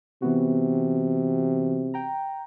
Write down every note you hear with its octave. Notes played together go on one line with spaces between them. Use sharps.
C3 E3 B3 F#4
G5 A#5